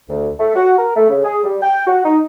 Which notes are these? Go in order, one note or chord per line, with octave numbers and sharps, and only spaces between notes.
D2
A3
F#4
A#4
A3
C#3
G#4
G3
G5
F#4
D#4